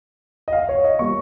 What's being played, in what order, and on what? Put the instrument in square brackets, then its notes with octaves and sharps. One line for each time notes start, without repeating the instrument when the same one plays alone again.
[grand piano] D#5
F5
C#5
D#5
G3 A#3 C#6